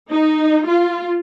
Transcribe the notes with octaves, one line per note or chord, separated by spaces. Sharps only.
D#4
F4